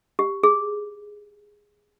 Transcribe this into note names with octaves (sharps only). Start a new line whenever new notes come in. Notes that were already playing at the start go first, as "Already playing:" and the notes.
G4
G#4